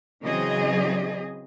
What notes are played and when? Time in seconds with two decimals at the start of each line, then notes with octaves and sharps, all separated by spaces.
0.23 C#3 E3 F#3 C4 G#4 D#5